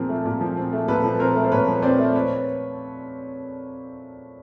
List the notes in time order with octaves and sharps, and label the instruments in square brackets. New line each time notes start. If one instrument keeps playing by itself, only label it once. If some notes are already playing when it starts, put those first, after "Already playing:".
Already playing: [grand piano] A#2 F3 C4 G#4 A#4
A3
A#2
F3
C4
A3
A#2 A4 B4
F3
C4 A#4 C5
A3
C5
A#2 B4 C#5
F3
C4 C5 D5
A3
B4 C#5